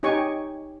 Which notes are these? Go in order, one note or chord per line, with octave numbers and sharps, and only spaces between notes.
D#4 G4 C#5 G#5 C#6